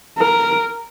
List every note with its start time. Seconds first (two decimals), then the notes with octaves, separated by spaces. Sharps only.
0.18 A#4